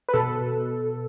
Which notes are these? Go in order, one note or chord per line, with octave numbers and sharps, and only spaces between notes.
B4
B2 A4
B2